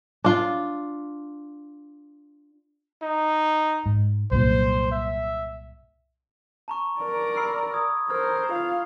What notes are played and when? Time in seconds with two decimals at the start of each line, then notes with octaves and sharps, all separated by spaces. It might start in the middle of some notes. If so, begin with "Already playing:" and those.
0.24 D4 F4
3.02 D#4
3.86 G#2
4.31 C2 F#2 A#2 C5
4.91 E5
6.68 A5 A#5 C#6
7.00 A#4 D5
7.37 B5 E6 C7
7.74 D#6 G#6
8.10 A#4 C5 A#5 F6 G#6
8.52 F4 F5